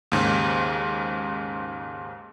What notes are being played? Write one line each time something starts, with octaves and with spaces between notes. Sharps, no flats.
D#2 G#2 C#3